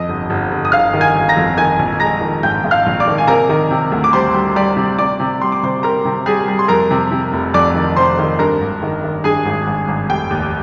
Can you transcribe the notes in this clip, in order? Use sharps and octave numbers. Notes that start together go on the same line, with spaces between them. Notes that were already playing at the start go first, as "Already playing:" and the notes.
Already playing: F2 D#5 D#6
G1
G1
G1
D#6
G1 F5 F6
D#3
G#5 G#6
G1
A#5 A#6
F2
D#3 G#5 G#6
A#1
G#3 A#5 A#6
D#3
G#2 G5 G6
G#2
F5 F6
A#1
D5 D6
D#3
G#5
C3 A#4 A#5
D#3
C3
D2
D6
G3 C5 C6
G3
G3 D5 D6
C3
C3 D5 D6
C3
G3 C6
D6
C3 C5 C6
G3 A#4 A#5
C3
G3 G#4 G#5
G3
C6
F2 A#4 A#5
C3
C3
F1
F2 D5 D6
D#3
C3 C5 C6
D#3
G2 A#4 A#5
G#1
D#3
D#3
G2 G#4 G#5
G#1
G#1
G#1
F1 G5
D#2